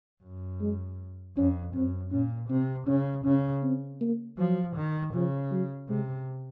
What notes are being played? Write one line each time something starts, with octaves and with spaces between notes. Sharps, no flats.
F#2
G#3
F2 C#4
F#2 C4
A#2 C#4
C3 C4
C#3 C#4
C#3 C#4
C4
A#3
F3 F#3
D#3
C#3 F3
F#3
C3 G#3